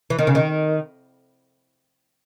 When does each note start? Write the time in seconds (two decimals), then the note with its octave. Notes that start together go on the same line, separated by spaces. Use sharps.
0.10 E3
0.19 D#3
0.27 C#3
0.35 D#3